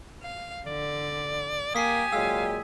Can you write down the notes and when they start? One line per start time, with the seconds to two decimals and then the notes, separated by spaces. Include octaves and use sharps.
0.22 F5
0.66 D3 D5
1.75 A#3 G4 G#5 D#6 B6 C7
2.12 A#2 F#3 G#3 F5 E6